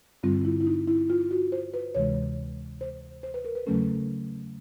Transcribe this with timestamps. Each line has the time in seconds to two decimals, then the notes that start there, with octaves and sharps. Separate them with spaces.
0.23 G2 D3 G3 C4 F4
0.45 E4
0.61 E4
0.67 D#4
0.88 E4
1.10 F4
1.31 F#4
1.52 C5
1.74 B4
1.95 D2 C3 E3 G#3 C#5
2.81 C5
3.23 C5
3.34 B4
3.45 A#4
3.55 B4
3.66 E2 C#3 F#3 A3 C#4 A4